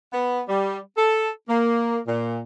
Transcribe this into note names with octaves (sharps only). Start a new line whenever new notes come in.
B3
G3
A4
A#3
A#2